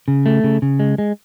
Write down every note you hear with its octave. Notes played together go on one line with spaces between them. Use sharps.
C#3
A3
C#3
C#3
G#3
G#3